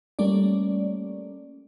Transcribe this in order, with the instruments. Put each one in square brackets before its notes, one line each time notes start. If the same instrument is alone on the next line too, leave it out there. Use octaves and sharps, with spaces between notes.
[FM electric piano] G3 A3 A#3 C#4 D5